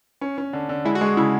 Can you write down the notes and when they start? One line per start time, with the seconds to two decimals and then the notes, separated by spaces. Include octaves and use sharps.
0.21 C#4
0.38 C#4
0.53 D3
0.69 D3
0.85 G#3 E4
0.95 F#4
1.01 G#3 G#4
1.17 C#3 E4